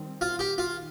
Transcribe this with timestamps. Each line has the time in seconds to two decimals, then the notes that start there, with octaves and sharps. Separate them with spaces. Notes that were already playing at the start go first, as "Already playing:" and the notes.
Already playing: D#3 G3 C4
0.21 F4
0.39 G4
0.57 D#3 F4